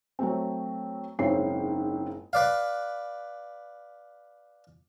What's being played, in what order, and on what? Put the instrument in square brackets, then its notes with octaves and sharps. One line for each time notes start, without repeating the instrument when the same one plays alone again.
[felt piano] F#3 A3 C4
F#1 G#2 C4 F4 C#5 C7
[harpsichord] B4 D5 F5